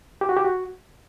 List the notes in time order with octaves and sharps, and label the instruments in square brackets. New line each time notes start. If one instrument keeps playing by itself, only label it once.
[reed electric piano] G4
F#4
G4
F#4